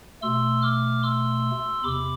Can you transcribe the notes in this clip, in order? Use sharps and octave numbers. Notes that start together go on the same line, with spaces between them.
B2 A3 C6 E6
D6 F6
C6 E6
E2 C3 B5 D6